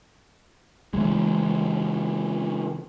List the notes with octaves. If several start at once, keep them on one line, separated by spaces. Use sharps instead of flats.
C#3 E3 G#3